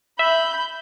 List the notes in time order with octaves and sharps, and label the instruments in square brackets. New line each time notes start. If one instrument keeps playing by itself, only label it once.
[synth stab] E5 [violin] B5 G6